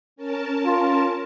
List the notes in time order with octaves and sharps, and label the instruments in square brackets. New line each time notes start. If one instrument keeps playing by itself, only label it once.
[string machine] C#4 A#4 A5
[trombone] F4